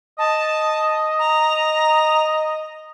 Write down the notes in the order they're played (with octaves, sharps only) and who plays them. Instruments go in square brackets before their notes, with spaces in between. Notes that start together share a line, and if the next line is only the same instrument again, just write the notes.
[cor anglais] D#5 [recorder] A5
[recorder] A#5